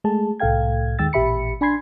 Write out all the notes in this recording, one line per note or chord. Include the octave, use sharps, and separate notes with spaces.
G#3 A3 G#4 A5
C2 A2 A4 F5 G5 G#6
D#2 D#3 G#3 G5 E6 A6
A1 A#2 G4 E5 B5 C#7
D4 G#5 B5 C6 G#6 C7